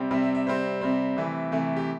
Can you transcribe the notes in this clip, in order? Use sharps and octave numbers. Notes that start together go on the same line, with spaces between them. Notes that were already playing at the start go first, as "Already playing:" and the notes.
Already playing: C3 G3 C4 G5
C3 G3 C4 E5
E5
E5
C3 G3 C4 C5
C3 G3 C4
C3 E3 A3
C3 E3 A3
G4